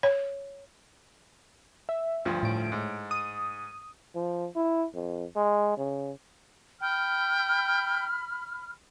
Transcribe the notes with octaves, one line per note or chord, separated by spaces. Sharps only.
C#5
E5
D2 G2 F3
A2 D7
G#2
D#6
F3
E4
F2
G#3
C#3
G5 B5 F6